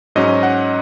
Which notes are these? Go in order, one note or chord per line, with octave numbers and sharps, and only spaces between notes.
G#2 F#3 C#4 D#5
F#5